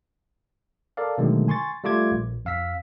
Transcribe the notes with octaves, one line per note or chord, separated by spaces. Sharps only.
A4 A#4 D5 F5
B2 D3 D#3 F#3 G#3 A3
G#5 C6 C#6 A6
G3 A3 F4 D6 G#6
A#1
F2 F5 E6 B6